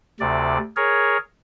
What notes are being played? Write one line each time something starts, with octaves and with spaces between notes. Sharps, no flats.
D2 C3 D5
G#4 A#4 C#5